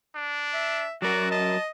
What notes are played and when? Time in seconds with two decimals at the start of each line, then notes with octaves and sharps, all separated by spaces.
0.15 D4
0.54 E5
1.02 F#3 F#4 A#4 D5
1.31 D#5 A5